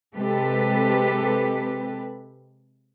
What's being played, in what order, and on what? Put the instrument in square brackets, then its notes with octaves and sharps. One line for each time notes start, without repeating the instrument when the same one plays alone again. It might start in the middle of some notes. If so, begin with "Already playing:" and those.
[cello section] C3 G#3 C4 G4 A4 B4